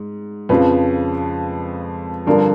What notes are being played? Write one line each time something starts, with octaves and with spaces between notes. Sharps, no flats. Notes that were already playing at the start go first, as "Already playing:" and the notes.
Already playing: G#2
F2 C#3 F3 B4
G2 D3 F3 A#4